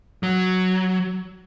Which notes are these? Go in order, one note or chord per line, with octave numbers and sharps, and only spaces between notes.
F#3